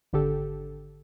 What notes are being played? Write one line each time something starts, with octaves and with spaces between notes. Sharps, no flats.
G#1 D3 G4 A4